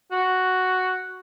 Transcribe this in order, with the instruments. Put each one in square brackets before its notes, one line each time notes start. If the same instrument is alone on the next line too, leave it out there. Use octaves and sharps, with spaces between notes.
[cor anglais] F#4